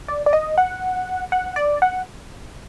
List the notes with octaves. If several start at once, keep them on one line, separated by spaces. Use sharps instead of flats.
D5
D5
D#5
F#5
F#5
D5
F#5